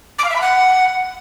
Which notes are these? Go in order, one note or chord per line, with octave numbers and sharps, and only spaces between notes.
D6
F5
E5
B5
F#5